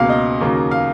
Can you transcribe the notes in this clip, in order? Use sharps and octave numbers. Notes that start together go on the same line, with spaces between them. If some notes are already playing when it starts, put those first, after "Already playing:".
Already playing: C#2 B2 A#3 F5
D#5
D#2 C#3 F#3 A#3
F5